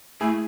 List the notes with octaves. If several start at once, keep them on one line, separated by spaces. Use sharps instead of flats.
A3 E4 G#4